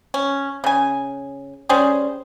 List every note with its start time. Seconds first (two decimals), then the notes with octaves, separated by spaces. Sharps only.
0.14 C#4
0.64 C#3 G#5
1.69 G3 C#4 G#4 C5